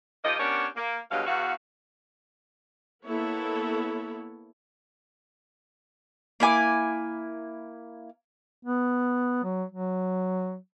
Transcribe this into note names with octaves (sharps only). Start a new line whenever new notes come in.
D#3 F3 A#3 G4 D#5
B3 C#4 D4 G4 A#4 C#5
A#3
G2 B2 F#3 G#3 F5
E2 F#4 F5
A#3 B3 E4 A4 C#5
A#3 E4 G#5 D6
B3
F#3
F#3